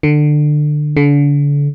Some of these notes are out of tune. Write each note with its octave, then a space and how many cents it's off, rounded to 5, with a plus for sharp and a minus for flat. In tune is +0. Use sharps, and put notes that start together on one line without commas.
D3 +25
D3 -35